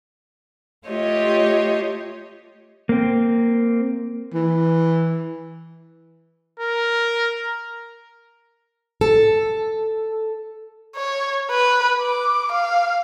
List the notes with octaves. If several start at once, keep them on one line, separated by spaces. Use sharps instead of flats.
A3 F4 G4 C#5 D#5
A#3 C4
E3
A#4
A4
C#5
B4
D6
F5